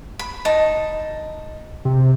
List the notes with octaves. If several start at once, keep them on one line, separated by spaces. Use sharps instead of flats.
B5
D#4 A5
C3